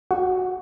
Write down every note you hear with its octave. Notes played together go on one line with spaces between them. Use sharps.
F#4